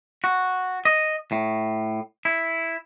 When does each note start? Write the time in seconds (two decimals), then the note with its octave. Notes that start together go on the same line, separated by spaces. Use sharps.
0.24 F#4
0.85 D#5
1.32 A2
2.25 E4